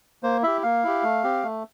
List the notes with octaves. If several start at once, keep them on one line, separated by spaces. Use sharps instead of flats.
A#3 C5
E4 G4 E5
A#3 F5
E4 G4
A3
C4 G4
A3